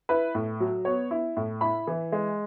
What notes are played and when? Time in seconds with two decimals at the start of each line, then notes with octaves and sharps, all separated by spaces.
0.09 E4 B4
0.35 A2
0.60 F#3
0.85 B3 C#5
1.11 E4
1.37 A2
1.61 E4 B5
1.87 E3
2.12 G#3